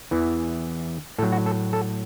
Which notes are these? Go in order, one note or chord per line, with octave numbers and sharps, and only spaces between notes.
E2 E3
A2 F#3 A4
F#4
A4
A4